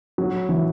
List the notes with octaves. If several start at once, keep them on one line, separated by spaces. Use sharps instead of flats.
F#3
E3